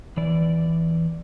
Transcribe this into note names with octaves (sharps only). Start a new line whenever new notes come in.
E2 E3 D5